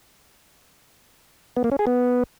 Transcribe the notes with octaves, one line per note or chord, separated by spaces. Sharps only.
B3
A#3
C#4
G#4
B3